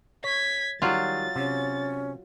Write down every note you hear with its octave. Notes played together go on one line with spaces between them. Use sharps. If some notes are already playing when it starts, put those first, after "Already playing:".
C#5 G#6 B6
D#3 F#3 G3 F4 A6
C3 C#4